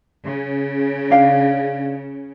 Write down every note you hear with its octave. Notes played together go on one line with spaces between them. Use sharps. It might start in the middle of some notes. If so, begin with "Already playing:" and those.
C#3
D4 F5 G5